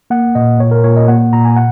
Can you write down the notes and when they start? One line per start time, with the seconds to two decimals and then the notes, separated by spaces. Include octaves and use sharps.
0.10 A#3 F#5
0.35 A#2 D#5
0.59 A#2 C#5
0.71 A#4
0.84 A#2 C#5
0.97 D#5
1.08 A#3 F#5
1.33 A#2 A#5
1.45 G#5
1.56 F#5